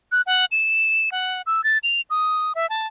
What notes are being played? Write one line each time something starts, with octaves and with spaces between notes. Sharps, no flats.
F#6
F#5
E7
F#5
E6
A6
F7
D#6
E5
A5